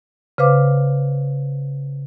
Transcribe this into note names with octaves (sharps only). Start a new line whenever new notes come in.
C#3 B4 C5 F5 D6 F6